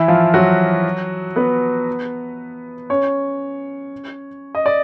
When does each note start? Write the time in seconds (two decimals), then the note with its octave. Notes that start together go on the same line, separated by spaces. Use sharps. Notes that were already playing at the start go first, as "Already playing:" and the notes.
Already playing: E3 E4
0.08 F3 F4
0.34 F#3 F#4
1.36 B3 B4
2.90 C#4 C#5
4.55 D#5
4.66 D5